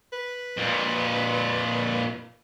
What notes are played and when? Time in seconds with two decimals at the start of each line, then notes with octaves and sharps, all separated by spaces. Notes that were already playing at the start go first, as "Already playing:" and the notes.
0.13 B4
0.57 F2 A#2